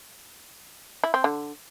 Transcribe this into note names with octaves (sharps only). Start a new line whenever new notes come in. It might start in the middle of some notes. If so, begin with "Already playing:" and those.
E4
C4
D3